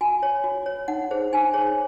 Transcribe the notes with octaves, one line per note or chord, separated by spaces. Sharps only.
F#4 G#5
C#5
F#4
C#5
D#4 F#5
G#4 C5
D#4 G#5
G#4 C5 C#5